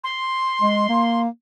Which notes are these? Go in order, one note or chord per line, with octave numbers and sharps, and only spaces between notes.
C6
G#3
A#3